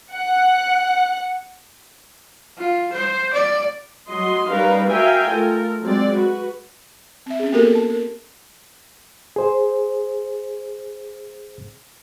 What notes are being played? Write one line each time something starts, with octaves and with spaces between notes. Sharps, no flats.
F#5
F4
C5
D5
F#3 F#4 D#5 C6
G3 C#4 D#4 A#4 B4 F5
F#4 A#4 E5 F5 G5 G#5
A3 F4 A4 A#4
F#3 G#3 C4 D5
F#4 B4
C4 E5
C#4 G#4
A#3 B3 F#4 G4 A4 A#4
A5
A#4
G#4 C5